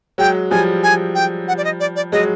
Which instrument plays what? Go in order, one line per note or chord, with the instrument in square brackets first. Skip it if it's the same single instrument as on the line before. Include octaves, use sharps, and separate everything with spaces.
[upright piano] F#3 G#3 [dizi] G5
[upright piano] F3 G3 [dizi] G#5
[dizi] G#5
G5
F#5
D5
D#5
D5
D5
[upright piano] F#3 G#3 [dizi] D#5